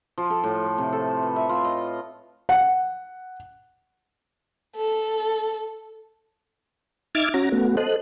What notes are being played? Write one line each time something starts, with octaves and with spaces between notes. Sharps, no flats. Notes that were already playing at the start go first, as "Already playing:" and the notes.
F3
A4
A2
A3
C3
A4
B4
E5
F4
D#5
F#5
A4
D#4 E5 D6 F6 G#6 A6
C#4 F#4 A#5
A3 B3 F#4
A4 C5 D#5 F#6